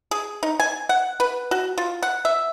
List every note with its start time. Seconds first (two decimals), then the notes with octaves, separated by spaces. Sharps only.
0.11 G#4
0.43 D#4
0.60 G#5
0.89 F#5
1.20 B4
1.51 F#4
1.78 F4
2.03 F#5
2.25 E5